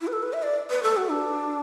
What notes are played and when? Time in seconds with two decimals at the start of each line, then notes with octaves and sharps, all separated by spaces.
0.01 E4
0.07 B4
0.13 A4
0.23 B4
0.33 E5
0.43 D5
0.70 B4
0.83 A4
0.97 F#4
1.10 D4